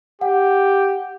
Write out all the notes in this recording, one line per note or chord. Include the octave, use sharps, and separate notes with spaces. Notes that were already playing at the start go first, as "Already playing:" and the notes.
G4 F#5